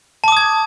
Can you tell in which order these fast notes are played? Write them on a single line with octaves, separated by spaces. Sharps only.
A5 D6 D#6 G#6